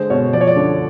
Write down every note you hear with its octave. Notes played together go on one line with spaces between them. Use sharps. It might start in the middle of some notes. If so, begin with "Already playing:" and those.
Already playing: D3 G#3 C5
B2 C#5
F3 D5
C#5
D5
D3